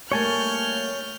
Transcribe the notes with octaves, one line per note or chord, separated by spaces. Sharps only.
G3 A3 A#3 C#5 G#5 A5 F6 G6